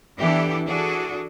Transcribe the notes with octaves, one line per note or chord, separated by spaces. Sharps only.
E3 B3 D4 E4 G4 A4
E3 D4 F#4 G#4 A4